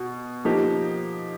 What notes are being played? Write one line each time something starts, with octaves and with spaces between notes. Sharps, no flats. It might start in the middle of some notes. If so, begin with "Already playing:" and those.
Already playing: B2
F3 A#3 D#4 G4